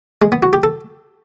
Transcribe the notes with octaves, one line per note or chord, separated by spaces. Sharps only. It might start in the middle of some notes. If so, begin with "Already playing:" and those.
G#3
B3
F#4
G4
A4